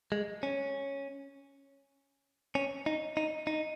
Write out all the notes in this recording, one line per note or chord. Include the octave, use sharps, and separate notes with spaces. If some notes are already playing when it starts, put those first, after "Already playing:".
G#3
C#4
C#4
D#4
D#4
D#4